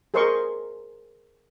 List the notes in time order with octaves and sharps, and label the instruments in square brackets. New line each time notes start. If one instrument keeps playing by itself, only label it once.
[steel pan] G#4 A#4 C5 D#5 C6 C#6